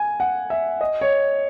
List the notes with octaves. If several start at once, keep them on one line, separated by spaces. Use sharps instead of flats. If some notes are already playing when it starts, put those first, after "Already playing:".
Already playing: G#5
F#5
E5
D#5
C#5